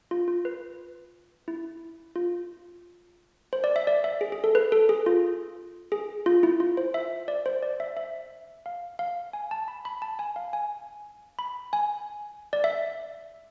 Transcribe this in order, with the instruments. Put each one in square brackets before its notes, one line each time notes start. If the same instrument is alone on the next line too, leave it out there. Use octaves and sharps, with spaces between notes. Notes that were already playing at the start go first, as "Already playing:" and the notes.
[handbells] F4
F4
B4
E4
F4
C5
D5
E5
D5
E5
G#4
G#4
A4
B4
A4
G#4
F4
G#4
F4
E4
F4
C5
E5
D5
C5
D5
E5
E5
F5
F5
G#5
A5
B5
B5
A5
G#5
F5
G#5
B5
G#5
D5
E5